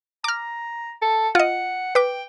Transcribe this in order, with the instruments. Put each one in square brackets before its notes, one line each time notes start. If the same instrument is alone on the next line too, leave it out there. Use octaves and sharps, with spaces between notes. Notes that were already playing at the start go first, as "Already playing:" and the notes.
[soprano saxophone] A#5 [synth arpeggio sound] D6 F6
[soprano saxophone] A4
[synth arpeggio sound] F4 D#5 [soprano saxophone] F#5
[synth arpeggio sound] B4 D6 [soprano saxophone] G5